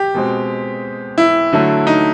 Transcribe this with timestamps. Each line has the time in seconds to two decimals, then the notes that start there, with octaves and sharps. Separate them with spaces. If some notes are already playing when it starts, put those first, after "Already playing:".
Already playing: G4
0.14 B2 G#3 C4
1.18 E4
1.53 D3 F#3 A3
1.87 D#4